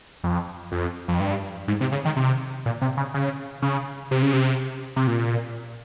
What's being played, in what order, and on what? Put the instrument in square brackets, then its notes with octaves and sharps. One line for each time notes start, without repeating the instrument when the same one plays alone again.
[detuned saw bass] F2
F2
F2
G2
G#2
C3
C#3
D#3
C3
A#2
C3
C#3
C#3
C#3
C3
C#3
C3
C3
A#2